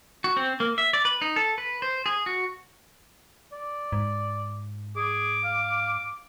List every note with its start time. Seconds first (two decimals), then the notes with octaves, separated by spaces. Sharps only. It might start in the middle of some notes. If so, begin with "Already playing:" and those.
0.24 F#4
0.37 C4
0.60 A#3
0.78 E5
0.93 D5
1.05 B4
1.22 D#4
1.36 A4
1.58 B4
1.82 C5
2.06 G#4
2.26 F#4
3.53 D5
3.92 G#2
4.96 G#4 D6
5.44 F5